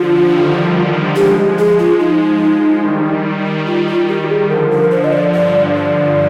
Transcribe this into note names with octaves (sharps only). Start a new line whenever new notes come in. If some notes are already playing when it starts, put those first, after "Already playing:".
Already playing: D3 F3 F4
D#3 G3
F3 G#3 G4
G#4
F4
D#4
D#3 G3
F4
F4
G4
G#4
D3 F3 A#4
A#4
C5
D#5
D5
G2 D5
D5